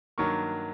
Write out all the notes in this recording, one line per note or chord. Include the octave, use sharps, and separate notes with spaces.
G2 D#3 F#3 A#3 C#6